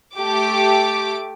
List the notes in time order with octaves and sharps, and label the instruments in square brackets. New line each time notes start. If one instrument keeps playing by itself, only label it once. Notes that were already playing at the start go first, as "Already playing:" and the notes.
[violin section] A3 G4 D6